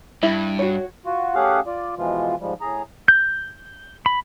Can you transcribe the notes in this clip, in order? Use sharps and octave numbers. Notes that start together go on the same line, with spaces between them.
G2 E4
F#4 C#5
F4 F#4
A3 C#4 G4 G#4 F5 F#5
F4 D5
B2 E3 F3 G#3 F4
G#2 F3 G3 G#3
A2 G#4 A#5
G6
B5